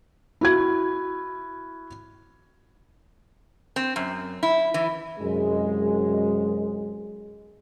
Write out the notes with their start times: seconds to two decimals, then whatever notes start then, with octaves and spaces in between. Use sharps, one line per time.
0.41 E4 F#4 G#6
3.76 C4
3.96 F#2
4.43 E4
4.74 E3
5.20 C2 F#2 G#3